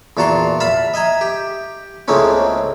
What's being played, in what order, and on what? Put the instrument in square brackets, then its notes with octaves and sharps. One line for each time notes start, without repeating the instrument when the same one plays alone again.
[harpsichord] E2 A#2 F#4 A5 A#5 C6
E5 F5 A5 B5
D#5 E5 G#5 A#5
G4
C#2 A2 G#3 A#3 C4 C#4